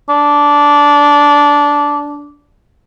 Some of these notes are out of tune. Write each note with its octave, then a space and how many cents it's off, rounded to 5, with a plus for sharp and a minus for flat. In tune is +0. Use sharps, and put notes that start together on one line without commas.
D4 -15